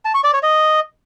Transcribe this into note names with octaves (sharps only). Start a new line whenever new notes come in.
A5
C#6
D5
C#5
D#5